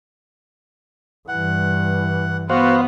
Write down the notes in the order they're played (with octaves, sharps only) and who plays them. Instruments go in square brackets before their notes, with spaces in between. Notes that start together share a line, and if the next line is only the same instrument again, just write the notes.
[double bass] G2 E3 [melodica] F#5
[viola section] B3 [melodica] F#4 [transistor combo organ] C5 F5 F#5